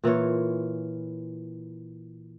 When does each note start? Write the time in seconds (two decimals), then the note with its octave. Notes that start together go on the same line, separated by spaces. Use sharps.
0.04 A#2 E3 F4 C#5